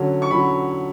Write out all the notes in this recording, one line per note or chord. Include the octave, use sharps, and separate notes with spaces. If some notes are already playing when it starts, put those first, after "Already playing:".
Already playing: D3 F#3 C#4
C#6
D3 F#3 C#4 B5